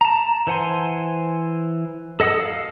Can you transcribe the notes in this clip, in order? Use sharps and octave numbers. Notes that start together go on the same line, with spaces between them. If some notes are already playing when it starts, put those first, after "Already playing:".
A5 A#5
E3 C5 F#5 G#5 C6
A4 D#5 F#5 D#6 E6
F5